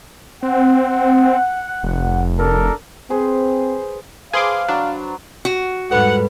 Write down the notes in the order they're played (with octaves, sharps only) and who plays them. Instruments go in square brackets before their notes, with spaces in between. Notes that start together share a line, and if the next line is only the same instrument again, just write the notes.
[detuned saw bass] C4 [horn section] F#5
[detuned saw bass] F1
[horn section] D4 A4 A#4
[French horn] C4 [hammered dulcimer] G#4 B4 C5
[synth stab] G#4 C6 D6 [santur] B4 C5 A5 [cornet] F5
[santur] F#3 [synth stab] D4
[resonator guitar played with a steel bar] F#4
[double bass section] E2 G#2 G3 [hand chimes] A4 B4 B5 [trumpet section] F#5